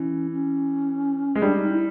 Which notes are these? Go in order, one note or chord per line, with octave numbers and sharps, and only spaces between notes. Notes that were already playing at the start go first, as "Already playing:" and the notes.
Already playing: E3 C#4
C#4
G#3
G3 D4
D#4
E4